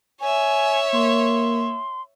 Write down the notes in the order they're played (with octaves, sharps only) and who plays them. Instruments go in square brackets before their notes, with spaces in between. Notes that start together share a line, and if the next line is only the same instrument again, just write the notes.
[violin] C#5 E5 [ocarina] G#5
[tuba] A#3 [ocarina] C6